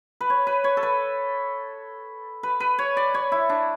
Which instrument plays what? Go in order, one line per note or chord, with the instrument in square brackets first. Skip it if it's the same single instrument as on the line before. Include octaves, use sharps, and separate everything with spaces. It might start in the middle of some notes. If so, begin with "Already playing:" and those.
[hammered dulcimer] B4
C#5
B4
C#5
A4
B4
B4
B4
C#5
D5
C#5
E4
D4